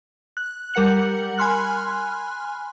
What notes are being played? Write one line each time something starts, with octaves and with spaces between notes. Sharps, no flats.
F#6
G3 A#4 F#5 C#7 F#7
G#5 B5 C6 F6 F#6